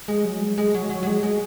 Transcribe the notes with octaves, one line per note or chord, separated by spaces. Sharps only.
G#3
F#3
G#3
G#3
F#3
F#3
F#3
G#3
G#3